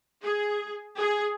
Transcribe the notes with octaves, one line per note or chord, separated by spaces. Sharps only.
G#4
G#4